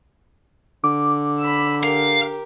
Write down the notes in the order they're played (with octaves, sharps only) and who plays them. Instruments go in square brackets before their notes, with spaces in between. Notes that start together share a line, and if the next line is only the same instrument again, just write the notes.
[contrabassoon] D3 [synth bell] D6
[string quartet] B5 E6
[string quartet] G4 A#4 [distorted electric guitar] F5